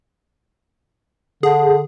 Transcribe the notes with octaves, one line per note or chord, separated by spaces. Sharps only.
D3 G#4